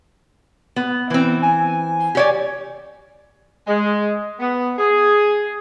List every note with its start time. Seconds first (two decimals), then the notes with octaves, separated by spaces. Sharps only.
0.76 B3
1.10 E3 B3 C4
1.42 G#5
2.15 G4 C#5 D5
3.67 G#3
4.40 B3
4.78 G#4